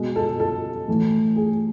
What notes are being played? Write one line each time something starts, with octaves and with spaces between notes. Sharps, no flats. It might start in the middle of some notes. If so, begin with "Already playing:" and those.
Already playing: B2 G#3
A4
A4
A2 E3 A3
G#4